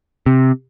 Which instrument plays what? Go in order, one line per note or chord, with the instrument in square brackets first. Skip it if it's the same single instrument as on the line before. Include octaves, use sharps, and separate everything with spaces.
[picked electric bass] C3